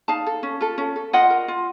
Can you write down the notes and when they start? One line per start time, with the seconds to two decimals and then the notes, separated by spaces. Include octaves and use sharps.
0.08 D#4 F5 A5
0.26 A4
0.43 C#4
0.60 F4 A4
0.78 C#4
0.96 A4
1.13 F4 D#5 F#5
1.30 A#4
1.48 F4